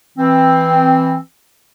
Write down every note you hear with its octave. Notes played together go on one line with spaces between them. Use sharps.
E3 C4